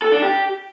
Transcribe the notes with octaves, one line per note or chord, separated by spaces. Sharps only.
A4
D4
G4